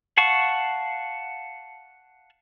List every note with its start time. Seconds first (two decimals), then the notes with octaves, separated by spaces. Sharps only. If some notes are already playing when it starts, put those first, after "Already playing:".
0.17 F5 F#5 A5 C#6